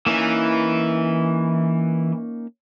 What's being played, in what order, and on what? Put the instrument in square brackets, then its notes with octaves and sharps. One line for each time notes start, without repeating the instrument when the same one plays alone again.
[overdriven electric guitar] E3 [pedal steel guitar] A#3 C#4 D#4